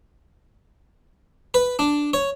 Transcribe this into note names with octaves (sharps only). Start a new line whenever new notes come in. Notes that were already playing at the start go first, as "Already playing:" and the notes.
B4
D4
C#5